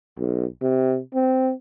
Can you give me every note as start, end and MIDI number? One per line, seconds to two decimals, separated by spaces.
0.18 0.45 35
0.62 0.99 48
1.14 1.52 60